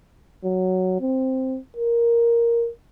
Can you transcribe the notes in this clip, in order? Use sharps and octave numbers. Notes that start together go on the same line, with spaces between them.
F#3
C4
A#4